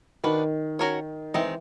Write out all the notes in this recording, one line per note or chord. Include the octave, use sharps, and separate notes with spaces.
D#3 D4 F#4 B4
C#4 F#4 A#4 C#5
D#3 E3 G#3 C4